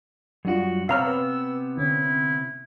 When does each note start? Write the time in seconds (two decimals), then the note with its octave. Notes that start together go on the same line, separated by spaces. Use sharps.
0.45 F#2 G3 D4 F4 F#4
0.89 C3 B3 C5 C#5 F5 A#5 E6 F6
1.07 B4
1.77 D3 C4 C#4 E4